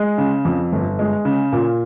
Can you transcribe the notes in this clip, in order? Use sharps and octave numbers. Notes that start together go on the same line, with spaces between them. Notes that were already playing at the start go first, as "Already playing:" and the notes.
Already playing: G#3
C#3
F2
G1
G#3
C#3
A#2